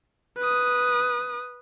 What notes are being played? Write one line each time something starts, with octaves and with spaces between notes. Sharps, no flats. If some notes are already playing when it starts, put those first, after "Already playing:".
B4 D#6